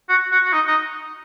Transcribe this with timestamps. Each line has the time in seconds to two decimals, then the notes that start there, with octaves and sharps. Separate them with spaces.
0.09 F#4
0.32 F#4
0.44 F#4
0.53 D#4
0.67 D#4